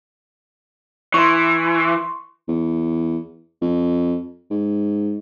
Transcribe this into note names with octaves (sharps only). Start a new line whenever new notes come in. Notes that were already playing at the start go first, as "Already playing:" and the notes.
E3 C6 C#6
E2
F2
G#2